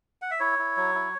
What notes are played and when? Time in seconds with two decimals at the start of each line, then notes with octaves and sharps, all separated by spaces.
0.22 F#5
0.31 E5
0.40 E4 C#5
0.59 E4
0.77 F#3
0.95 E4